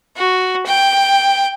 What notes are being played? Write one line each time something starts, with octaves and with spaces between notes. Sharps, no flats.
F#4
G5